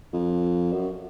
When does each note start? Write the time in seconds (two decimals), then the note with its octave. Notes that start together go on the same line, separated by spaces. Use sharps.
0.13 F2
0.73 F#2